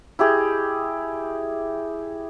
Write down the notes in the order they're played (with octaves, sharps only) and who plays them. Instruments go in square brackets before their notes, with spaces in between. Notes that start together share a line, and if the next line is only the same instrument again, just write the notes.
[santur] E4 G4 G#4 D#5